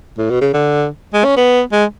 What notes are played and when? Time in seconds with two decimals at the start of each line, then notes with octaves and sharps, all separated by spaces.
0.18 A2
0.30 B2
0.41 C#3
0.53 D3
1.13 G#3
1.24 C#4
1.37 B3
1.72 G#3